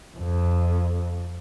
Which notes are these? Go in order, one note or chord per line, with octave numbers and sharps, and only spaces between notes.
F2